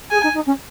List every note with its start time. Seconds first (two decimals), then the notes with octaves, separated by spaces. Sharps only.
0.11 G#4 G#5
0.23 D#4
0.34 D#4
0.46 C#4